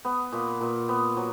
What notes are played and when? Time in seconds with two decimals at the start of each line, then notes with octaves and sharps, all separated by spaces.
0.05 B3
0.33 A#2
0.61 A#2
0.89 B3
1.17 F#3